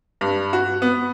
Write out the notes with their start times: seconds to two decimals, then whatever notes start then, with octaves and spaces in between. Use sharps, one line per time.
0.21 G2
0.53 F#4
0.82 B3